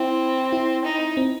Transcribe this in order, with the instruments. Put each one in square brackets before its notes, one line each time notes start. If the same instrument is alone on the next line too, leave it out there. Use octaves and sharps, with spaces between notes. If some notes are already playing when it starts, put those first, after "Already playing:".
Already playing: [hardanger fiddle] C4 [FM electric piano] E4
[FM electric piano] E4
[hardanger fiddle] D#4
[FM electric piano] C4